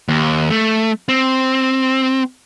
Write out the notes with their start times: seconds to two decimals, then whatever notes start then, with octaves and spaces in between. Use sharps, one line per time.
0.09 D#2
0.50 A3
1.09 C4